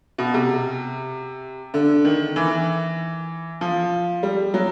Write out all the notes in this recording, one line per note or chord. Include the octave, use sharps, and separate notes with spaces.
B2
C3
D3
D#3
E3
F3
G3
F#3